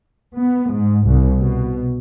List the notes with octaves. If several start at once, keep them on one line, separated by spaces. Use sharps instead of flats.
B3
G#2
C2
B2